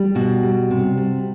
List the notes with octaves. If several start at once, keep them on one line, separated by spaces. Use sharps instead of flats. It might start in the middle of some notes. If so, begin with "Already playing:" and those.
Already playing: G3
B2 F#4
G3
C3
G3